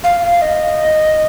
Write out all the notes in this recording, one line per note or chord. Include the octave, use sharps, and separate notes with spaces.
F5
F5
D#5